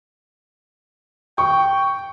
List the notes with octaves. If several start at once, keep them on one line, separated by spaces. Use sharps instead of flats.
G5 C#6